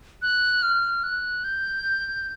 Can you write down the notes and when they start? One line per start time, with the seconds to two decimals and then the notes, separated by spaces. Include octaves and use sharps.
0.22 F#6
0.63 F6
1.03 F#6
1.44 G6